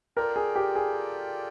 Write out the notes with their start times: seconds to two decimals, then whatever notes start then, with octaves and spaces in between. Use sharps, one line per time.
0.17 F4 A4 A#4 D5 G5
0.36 G#4
0.55 G4
0.75 G#4